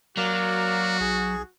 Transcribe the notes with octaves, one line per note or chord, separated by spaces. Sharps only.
F#3 A#3 F#4 A#4 D5
B1 G#4